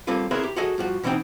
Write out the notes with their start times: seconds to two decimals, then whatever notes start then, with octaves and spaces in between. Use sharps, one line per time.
0.07 G3 A#3 C4 F4 A4 B4
0.31 C4 E4 G#4 A#4 B4 C#5
0.43 G4
0.56 F#4 G#4 A4 D#5
0.78 G2 F3 F#4
1.03 B2 E3 A3 C4 D#4 G5